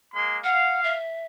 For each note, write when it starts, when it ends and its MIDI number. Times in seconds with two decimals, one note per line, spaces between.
0.14 0.39 56
0.14 0.39 58
0.14 0.39 84
0.44 0.94 77
0.44 0.82 78
0.84 1.26 76